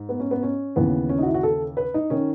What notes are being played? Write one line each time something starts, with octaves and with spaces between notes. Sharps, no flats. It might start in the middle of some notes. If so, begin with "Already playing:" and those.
Already playing: G#2
B3
C#4
B3
C#4
D#2 C#3 E3 B3
C#4
D#4
F#4
E4
F#4
A4
B4
D#4
D#3 C#4